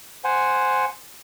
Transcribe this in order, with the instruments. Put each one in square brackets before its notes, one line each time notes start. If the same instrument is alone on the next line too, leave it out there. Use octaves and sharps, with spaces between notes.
[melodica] C5 F#5 G#5